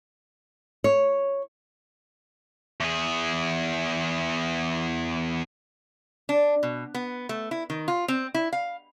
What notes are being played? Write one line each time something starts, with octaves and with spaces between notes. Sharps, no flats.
C#5
E2 G#4
D4
B2
B3
A3
E4
D#3
F4
C4
E4
F5